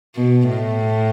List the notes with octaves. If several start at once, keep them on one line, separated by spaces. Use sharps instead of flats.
B2
A2